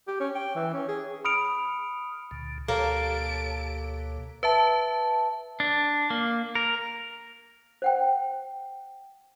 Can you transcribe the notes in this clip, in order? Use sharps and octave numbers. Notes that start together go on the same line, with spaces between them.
G4
C#4
G5
E3
C#4
G#4
B5 D#6 F6 C#7 D7 F7
C#2 A#2 D3
D2 B2 A#3 G4 A4 C#5 A5 D7
B4 E5 A5
D4
A#3
A#4
C5 F#5 G5